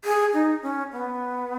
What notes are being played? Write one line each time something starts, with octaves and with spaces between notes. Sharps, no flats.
G#4
D#4
C#4
B3